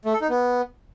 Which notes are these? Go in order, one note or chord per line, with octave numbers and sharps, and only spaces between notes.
A3
A4
D#4
B3